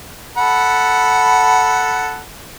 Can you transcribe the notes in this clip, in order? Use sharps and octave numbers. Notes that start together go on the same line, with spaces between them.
A4 F#5 B5